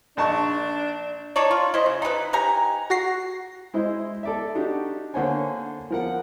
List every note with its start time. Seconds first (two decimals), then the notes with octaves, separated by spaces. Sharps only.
0.17 A#1 D4 A5 C#6
1.36 D4 D#4 C#5 D5
1.51 F4
1.74 E4 C5 D#5
1.86 C#3
2.02 D#4 E4 G#4 B4
2.33 D#4 G4 G#5 A#5
2.90 F#4 A#6 C7
3.74 G#3 E4 C5 D#5
4.23 A4 D5 E5
4.55 D4 D#4 F#4 G4
5.14 D3 A#3 C5 C#5 G#5
5.90 F3 A#4 F#5